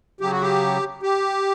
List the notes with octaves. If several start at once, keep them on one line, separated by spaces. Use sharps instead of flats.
C#3 F#3 G4
F#4
G4
G4